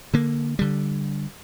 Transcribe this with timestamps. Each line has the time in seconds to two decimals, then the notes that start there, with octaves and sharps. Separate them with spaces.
0.14 D3 A#3
0.59 D3 G3